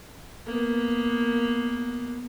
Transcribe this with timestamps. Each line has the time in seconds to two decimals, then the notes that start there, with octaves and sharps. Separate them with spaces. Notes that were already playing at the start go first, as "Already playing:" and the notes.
0.46 A#3 B3